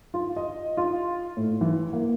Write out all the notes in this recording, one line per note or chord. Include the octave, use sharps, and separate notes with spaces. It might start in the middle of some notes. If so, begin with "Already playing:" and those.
F4
D#5
F4
A2
E3
A#3